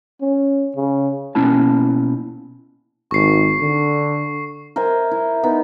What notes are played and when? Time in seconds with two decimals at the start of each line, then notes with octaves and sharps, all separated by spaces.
0.21 C#4
0.76 C#3
1.35 B2 A#3 C#4 E4 A5
3.11 G#1 C#6 C7
3.61 D3
4.76 A#4 C5 E5 G#5
5.11 E4
5.43 B3 D#4